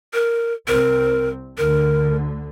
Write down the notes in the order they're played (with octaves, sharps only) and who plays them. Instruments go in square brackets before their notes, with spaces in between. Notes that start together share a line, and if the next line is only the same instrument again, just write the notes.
[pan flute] A#4
[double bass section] C2 C4 [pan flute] A#4
[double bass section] D2 D3 [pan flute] A#4